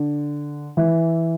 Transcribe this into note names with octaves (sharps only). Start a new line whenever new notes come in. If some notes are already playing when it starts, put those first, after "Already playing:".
Already playing: D3
E3